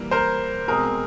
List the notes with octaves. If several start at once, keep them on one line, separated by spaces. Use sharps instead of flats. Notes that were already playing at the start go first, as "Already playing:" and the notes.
Already playing: E3 G3 A#3
A#4 C5
B2 G#3 C4 G#4 A#4